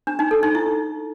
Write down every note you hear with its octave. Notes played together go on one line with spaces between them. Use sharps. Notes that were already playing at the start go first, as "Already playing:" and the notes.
D4
D#4
A4
D#4
E4